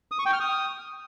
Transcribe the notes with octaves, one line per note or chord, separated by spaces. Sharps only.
D#6
C#6
G5
F6
D#6